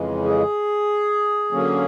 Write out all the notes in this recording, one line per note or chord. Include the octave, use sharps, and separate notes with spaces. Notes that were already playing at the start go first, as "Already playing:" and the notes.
Already playing: F2 C#3 E3 G#3
G#4
D3 F#3 A#3 C#4